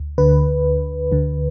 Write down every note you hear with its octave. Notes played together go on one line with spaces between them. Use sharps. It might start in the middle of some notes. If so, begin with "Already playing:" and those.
Already playing: D2
D2 D3 B4
D2 D3